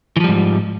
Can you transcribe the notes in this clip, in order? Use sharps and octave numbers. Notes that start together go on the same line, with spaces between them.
G#2 E3 F3 G3